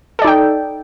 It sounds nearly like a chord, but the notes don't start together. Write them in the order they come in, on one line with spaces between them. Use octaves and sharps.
A4 D5 D#4 G5